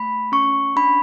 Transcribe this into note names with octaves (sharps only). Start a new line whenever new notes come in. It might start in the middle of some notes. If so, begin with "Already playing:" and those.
Already playing: A3 B5
C#4 C#6
D4 B5